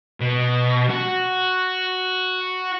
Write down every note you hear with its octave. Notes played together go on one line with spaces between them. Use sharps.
B2
F#4